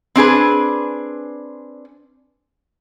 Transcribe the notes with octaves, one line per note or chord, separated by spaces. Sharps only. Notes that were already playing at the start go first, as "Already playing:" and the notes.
C4 D4 G#4 B4